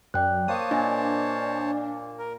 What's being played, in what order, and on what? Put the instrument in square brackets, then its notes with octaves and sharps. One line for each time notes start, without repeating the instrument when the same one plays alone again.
[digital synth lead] F#2 [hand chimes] D5 G5 F#6
[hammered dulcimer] A#3 [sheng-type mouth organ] C5 C#5 A5 [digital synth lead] D#6
[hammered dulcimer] A#2 [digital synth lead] D4 [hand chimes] D#5 G#5
[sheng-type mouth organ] A#4